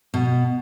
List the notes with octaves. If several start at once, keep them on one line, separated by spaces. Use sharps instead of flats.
B2